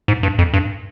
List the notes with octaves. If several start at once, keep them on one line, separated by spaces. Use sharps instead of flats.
G#2
G2
F2
G2